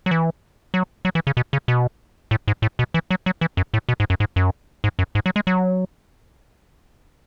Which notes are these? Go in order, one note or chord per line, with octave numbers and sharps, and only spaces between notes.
F#3
E3
F#3
F#3
E3
C#3
B2
C#3
B2
A2
G#2
A2
B2
E3
F#3
F#3
E3
F#2
A2
B2
G#2
F#2
G#2
F#2
G#2
F#2
G#2
F#3
G#3
F#3